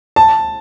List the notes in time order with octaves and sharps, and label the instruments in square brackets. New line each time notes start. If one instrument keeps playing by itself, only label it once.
[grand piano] A5